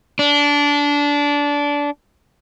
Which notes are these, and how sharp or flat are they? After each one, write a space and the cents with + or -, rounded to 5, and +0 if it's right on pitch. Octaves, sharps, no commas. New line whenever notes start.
D4 -20